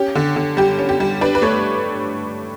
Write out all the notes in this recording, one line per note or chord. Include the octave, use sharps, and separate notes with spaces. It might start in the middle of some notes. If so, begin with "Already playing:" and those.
Already playing: C#4 G4
D3
D3
G3 G4
C#4
G4
G3
D4 B4
B4
A3 C#5